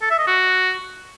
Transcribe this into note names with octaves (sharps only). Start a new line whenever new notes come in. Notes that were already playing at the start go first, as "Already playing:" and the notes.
A4
E5
D#5
F#4